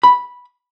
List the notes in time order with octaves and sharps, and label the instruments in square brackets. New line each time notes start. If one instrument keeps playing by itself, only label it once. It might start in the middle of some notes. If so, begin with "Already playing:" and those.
[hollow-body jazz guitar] B5